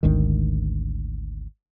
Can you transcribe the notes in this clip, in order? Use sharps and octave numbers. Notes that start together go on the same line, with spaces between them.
G#1 D2 D#3